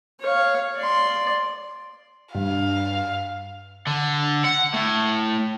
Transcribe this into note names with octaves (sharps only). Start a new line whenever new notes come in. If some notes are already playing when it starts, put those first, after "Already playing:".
C#5 F5
D5 C6
G2 F5
D3
F#5
A2